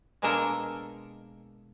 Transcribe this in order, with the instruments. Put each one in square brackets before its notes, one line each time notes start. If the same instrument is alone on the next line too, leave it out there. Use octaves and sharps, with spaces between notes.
[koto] B2 G#3 A#3 D4 A4 A#4